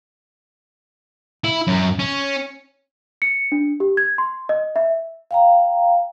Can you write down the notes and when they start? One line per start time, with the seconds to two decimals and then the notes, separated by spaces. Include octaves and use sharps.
1.44 E4
1.67 F#2
1.99 C#4
3.22 C#7
3.52 D4
3.80 G4
3.97 G#6
4.18 C6
4.49 D#5
4.76 E5
5.31 F5 G5 A#5